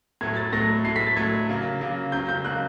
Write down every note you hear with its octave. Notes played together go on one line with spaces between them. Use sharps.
A2 F#3 A3 G#6
A6
A2 F#3 A3 A#6
A2 F#3 A3 C7
B6
A6
A2 F#3 A3 G#6
C#3 F#3 A#3
C#3 F#3 A#3
C#3 F#3 A#3 G6
G6
C#3 F#3 A#3 F#6